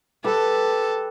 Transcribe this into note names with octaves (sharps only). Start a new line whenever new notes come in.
G4 A4 B4